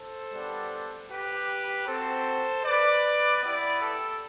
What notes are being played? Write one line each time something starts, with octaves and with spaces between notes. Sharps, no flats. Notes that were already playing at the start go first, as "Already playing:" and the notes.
Already playing: A4 C5
G3 B3 D4
G4 B4
C4 F#4 A4 C5
B4 D5
B3 E4 G4 B4 D5
A4